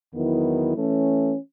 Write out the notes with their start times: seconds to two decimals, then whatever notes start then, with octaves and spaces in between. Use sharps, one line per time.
0.13 E2 D#3 F#3 B3 E4
0.75 E3 A3 C#4